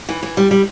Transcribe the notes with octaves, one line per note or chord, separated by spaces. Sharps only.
E3
E3
G3
G3